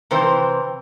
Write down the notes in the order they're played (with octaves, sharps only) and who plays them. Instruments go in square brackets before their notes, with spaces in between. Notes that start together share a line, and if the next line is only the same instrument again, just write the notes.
[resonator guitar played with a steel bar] C3 E3 C4 C5